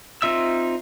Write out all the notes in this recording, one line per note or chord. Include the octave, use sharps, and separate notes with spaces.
C4 D#4 F4 E5 E6